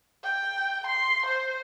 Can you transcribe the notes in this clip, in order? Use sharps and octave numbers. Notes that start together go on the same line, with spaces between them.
G5
C6
C5